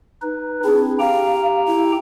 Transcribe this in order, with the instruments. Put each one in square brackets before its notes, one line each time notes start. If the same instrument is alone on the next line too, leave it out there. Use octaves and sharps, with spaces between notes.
[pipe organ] D#4 B4
[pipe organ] C4 D4 E4 [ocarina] G#4
[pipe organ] G4 G5 A#5 [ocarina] F5
[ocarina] E4